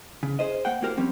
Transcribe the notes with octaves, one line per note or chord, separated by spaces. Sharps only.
C#3
G#4 C5 D#5
A#3 F#5 G5
A#3 F#4 G4 A#4 C5
F3 G3 C4 C#4